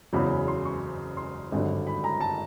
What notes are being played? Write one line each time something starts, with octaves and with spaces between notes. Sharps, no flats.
F#1 E2 C#3 F#3 B5
C6
C#6
C6
G#1 G2 D3 F#3
B5
A#5
A5